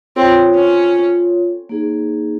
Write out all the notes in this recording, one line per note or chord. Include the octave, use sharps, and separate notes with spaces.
C4 F4 A4 C#5
C#4
A#3 D#4 G#4